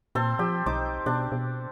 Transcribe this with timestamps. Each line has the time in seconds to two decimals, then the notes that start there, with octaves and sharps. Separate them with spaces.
0.15 A#2 C4 A4 C6
0.39 F3 G4
0.66 B1 D#4 C5 D6
1.06 B2 D4
1.32 B2